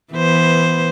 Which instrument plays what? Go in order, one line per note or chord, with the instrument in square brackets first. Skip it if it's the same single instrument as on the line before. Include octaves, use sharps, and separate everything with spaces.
[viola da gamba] E3 B3 C5